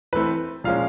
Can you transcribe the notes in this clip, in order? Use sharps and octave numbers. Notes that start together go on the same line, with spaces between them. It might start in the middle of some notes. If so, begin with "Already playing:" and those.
E3 A3 C4 B4
A#2 F3 G#3 C#4 F5